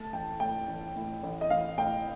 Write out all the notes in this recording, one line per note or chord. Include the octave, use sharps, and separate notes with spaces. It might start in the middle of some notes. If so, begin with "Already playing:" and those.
Already playing: A3 A5
A1 G5
A2 G5
A1
A2
A1
D#5
A1 F5
A2 G5